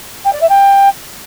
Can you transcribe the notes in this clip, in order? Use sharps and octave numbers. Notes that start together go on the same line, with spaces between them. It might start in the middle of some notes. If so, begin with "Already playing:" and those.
G5
D5
E5
G5